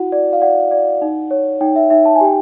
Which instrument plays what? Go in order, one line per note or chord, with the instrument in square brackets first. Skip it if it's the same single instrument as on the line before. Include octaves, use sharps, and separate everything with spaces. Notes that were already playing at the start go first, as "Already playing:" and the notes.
Already playing: [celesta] E4 F#4 F#5
D5
F5
D5 F#5
D5
D#4
C#5
D#4 G5
E5
D#4 E5
A5
G#5
G4 G5